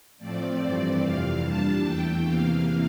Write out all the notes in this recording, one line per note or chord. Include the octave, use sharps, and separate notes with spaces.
A2 F3 A3 C4 D5
G2 E3 A3 C4 D5
F2 C3 E3 F5
A#2 G3 D4 A5
E2 E3 A3 G5
E2 C3 E3 A#3 F5